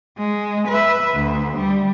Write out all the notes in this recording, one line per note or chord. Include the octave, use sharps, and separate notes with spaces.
G#3
B4 E5
D2
G3